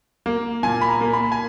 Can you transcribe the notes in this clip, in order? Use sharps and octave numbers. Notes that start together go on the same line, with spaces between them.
A#3
A#2 G#5
B5
A#5
A#3
B5
G#5